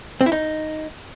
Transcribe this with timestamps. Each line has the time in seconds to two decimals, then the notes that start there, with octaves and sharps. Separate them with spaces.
0.21 C4
0.26 E4
0.32 D#4